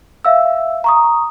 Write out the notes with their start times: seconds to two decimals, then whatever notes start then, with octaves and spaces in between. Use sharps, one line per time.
0.25 E5 F5 E6
0.84 A#5 C#6 D#6